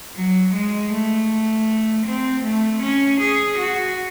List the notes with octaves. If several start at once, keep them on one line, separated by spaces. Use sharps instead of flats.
F#3
G#3
A3
C4
A3
C#4
G#4
F#4